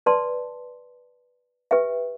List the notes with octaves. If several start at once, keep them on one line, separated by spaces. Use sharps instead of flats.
B4 D5 A5 C6
G4 B4 E5 G5